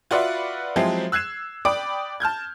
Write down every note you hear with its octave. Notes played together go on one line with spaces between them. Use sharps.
F4 F#4 B4 D5 E5 F#5
F3 F#3 G#3 C4 E4 G4
E6 F#6 G#6 C7 E7
D5 G5 B5 D6 D#6 D7
A5 F6 G6 G#6